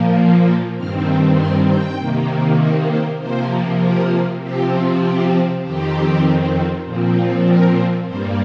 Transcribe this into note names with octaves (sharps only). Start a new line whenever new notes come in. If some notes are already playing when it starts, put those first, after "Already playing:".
Already playing: A#2 F3 A#3
G2 D#3 C4 F6
C6
G5
C3 D#3 A#3
D#5
C5
C3 F3 A#3 C5
A#4
C3 F3 C4 G4
G4
F2 D#3 C4 G4
A#2 F3 C4
A#4
G2 G3 A#3 C5